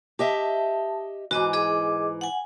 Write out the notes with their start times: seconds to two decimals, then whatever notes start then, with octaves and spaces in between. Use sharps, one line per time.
0.19 G4 D#5 E5 A5
1.31 G#2 E3 F#4 D#5 D6
1.53 G#4 D#5 D6
2.21 F#5 G#5